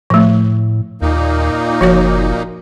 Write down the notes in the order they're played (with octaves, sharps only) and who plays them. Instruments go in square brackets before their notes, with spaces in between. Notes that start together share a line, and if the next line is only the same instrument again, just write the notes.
[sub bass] A2 [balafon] F3 A3
[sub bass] D#2 [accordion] A#2 A#3 D#4
[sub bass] F#1 [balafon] F3 F#4 C#5